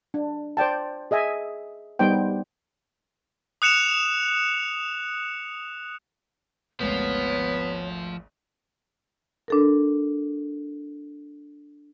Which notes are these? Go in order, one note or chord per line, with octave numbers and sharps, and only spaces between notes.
D4
C5 D5 G5 A5
G#4 D#5 E5 G#5
G3 B3 D#4 C5 G5
D#6 F#6 C#7 E7 F7
G#1 D2 F3 B3 C#5
D4 A4 A#4